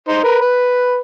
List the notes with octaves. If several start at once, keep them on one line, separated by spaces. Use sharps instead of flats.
D#4 C5
A#4 B4
B4